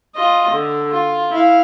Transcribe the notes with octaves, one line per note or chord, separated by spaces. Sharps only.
F4 D#5
D3
F4
E4 F5